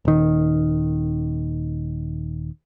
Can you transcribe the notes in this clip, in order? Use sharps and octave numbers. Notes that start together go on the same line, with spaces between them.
D#1 D#3